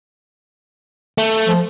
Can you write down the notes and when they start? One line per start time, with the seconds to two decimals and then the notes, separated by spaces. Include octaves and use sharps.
1.18 A3
1.47 F3